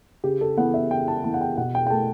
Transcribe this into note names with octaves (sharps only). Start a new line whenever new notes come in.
C#3 G4
A4
E3 B3 F#5
E5
C#3 G5
A5
E3 B3 A5
F#5
G5
B2 F#5
G5
G5
A3 A5